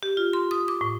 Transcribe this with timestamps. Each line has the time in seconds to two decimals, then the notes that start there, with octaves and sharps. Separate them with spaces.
0.03 G4
0.17 F4
0.33 C6
0.51 D#6
0.68 D6
0.81 A2